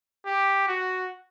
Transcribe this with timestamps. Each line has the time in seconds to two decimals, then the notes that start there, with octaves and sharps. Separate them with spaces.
0.26 G4
0.68 F#4